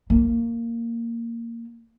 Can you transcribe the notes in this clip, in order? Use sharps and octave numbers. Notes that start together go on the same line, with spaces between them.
A#3